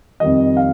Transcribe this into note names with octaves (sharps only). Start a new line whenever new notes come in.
F2 D#3 G3 D#5
F5